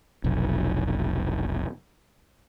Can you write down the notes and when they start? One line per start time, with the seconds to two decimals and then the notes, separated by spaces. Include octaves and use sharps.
0.24 F1 B1